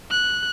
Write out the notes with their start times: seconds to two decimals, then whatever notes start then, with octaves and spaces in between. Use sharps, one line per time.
0.11 F#6